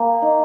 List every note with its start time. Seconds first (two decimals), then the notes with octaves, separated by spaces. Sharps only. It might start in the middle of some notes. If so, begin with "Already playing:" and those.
Already playing: A#3 G#4
0.22 D#4